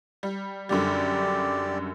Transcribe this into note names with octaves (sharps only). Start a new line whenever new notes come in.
G3
F#2 D3 G3 G4 D5